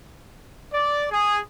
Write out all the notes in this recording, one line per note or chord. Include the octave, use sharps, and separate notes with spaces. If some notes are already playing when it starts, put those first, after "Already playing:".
D5
G#4